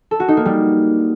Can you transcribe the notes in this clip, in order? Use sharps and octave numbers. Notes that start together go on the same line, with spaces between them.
A4
F#4
D#4
A#3
G3